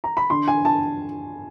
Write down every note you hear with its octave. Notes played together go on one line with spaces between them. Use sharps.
A#5
B5
D3 C6
G#5
A5